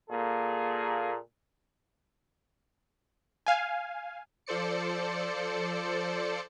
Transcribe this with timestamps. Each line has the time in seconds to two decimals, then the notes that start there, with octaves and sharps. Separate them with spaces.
0.10 A#2 A#3 G#4 A4
3.46 F5 G#5
4.46 F3 A4 C5 D5 C#7